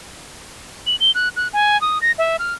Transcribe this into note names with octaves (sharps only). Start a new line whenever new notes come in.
F#7
G7
F#6
F#6
G#5
D#6
A#6
E5
F6